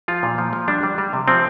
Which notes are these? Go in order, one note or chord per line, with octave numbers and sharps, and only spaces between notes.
F3 F4
A#2
F3
F3
G3 D4
G3
G3
C3
F3 C4